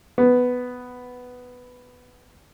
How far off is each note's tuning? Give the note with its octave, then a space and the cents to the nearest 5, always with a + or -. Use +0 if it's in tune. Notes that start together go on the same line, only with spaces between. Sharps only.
B3 +5